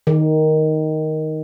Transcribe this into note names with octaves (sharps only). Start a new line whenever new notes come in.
D#3